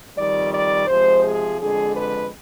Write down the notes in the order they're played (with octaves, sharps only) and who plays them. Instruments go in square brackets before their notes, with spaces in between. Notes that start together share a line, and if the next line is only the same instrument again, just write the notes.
[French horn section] F2 D#3 G3 D5
D5
C3 F3 G#3 C5
G#4
F2 D3 G#3 G#4
B4